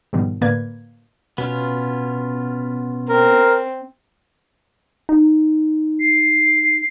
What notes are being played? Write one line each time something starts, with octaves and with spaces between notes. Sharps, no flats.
G#2 B2 D#3 F3 G3 B3
A2 D3 A#3 B4 D5 G#6
B2 B3 C#4 F4
C4 A#4
D#4
C7